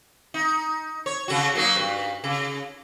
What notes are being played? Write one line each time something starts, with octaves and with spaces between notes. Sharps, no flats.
D#4
C#5
C#3 F#4
F#3 A#3 D#4
G2
C#3